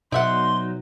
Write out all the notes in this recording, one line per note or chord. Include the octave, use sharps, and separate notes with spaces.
B2 F#3 D#4 D5 E5 F#5 C6